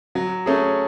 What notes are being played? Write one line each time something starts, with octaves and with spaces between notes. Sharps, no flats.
F#3
A3 C#4 G#4